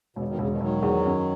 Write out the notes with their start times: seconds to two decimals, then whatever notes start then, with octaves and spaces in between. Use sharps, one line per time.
0.16 E1 B2
0.28 B2 D#3
0.38 E1 C#3
0.50 B2 D#3
0.61 E1 D#3 F#3
0.83 E2
1.05 F#2